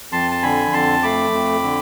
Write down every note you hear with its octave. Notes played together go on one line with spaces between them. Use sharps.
F2 A5 C6
A5
D3 G#5 B5
F2 A5 C6
A3 B5 D6
F2
D3